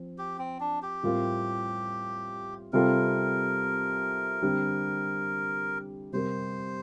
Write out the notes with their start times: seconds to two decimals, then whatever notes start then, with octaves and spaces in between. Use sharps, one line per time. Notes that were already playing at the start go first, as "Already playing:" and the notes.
Already playing: F3 C4
0.18 G4
0.39 C4
0.60 D4
0.82 G4
1.03 A2 G3 C4 F4 A#4
2.73 C3 G3 C4 F4 A4 A#4
4.42 D3 G3 C4 G4
6.13 C3 G3 C4 G4 A#4 C5